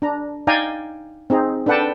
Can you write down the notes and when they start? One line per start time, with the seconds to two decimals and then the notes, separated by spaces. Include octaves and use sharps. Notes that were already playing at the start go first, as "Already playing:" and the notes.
0.02 D4 A#5
0.47 D#4 D5 F5 G5 G#5 A#5
1.30 C4 D#4 G#4 A#5
1.66 D4 A4 B4 F#5 G5 A5